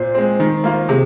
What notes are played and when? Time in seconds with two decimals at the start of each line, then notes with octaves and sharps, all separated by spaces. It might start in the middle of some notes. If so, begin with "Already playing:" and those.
Already playing: A#2 C5
0.15 G#3 C4
0.40 D#3
0.64 A#3 F4
0.89 C3 G#4